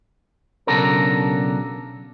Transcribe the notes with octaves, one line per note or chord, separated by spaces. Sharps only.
B1 C#3 D4 F#4 A4 A#4